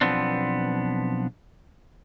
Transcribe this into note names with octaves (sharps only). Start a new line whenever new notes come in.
B1 F3 B3 C4 D4